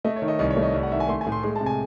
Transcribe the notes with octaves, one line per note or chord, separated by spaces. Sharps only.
A3 D#5
C#5
D#3
D#5
C2 D#5
C#5
A3
D#5
C2 E5
F#5
D#3 E5
G#5
A3 C6
G#5
A2
C6
G#3 C6
A5
C3
G#5